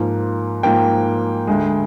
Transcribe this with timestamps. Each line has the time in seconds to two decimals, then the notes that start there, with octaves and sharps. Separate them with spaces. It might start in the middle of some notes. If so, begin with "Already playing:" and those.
Already playing: G#2 F3 A#3
0.63 G#2 F3 A#3 G5
1.47 D2 D3 G#3